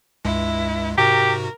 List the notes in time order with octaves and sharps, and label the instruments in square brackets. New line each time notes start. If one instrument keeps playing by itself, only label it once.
[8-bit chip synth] C#2 G2 G#3 [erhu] E4
[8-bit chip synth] G#2 C3 F#4 [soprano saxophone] G4 [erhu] A#4